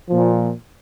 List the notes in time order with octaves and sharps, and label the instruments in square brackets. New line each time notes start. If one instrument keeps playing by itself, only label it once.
[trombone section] A#2 F3